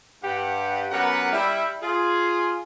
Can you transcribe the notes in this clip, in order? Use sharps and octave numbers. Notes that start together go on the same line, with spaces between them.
G2 G4 F#5
F#2 B3 G4 A#4 B4 F#5
G3 E4
F4 G#4